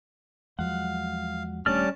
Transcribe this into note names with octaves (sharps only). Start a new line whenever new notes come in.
E2 F3 F#3 G#3 F5 F#5
D#1 G3 A3 C#4 D4 D5 A5 F6